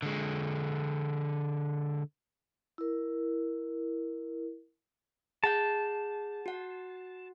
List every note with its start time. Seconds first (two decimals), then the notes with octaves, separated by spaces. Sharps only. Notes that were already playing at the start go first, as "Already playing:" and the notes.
0.02 D3 G#3
2.78 E4 A#4
5.44 G#4 F#5 A5 G6
6.46 F#4 F#5